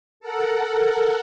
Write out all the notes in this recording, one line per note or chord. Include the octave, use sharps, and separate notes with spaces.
A4 A#4 F#5